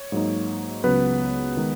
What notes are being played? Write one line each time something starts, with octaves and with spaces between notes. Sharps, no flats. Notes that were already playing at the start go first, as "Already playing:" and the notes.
Already playing: C#5
G#2 F#3 A#3 D#4
C#2 C#3 F#3 B3 B4
D#3 G#3 D#4